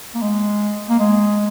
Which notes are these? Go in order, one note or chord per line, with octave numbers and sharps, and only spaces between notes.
A#3
G#3
A#3
G#3